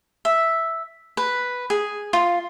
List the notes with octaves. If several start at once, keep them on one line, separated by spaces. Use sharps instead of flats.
E5
B4
G#4
F4